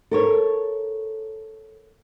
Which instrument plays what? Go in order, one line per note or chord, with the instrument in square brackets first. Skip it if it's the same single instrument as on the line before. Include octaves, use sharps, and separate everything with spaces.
[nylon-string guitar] A4 A#4 C#5